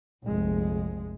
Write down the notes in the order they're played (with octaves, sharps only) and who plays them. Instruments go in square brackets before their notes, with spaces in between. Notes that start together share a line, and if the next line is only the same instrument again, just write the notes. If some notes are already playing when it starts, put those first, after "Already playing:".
[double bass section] F1 A#1 G#3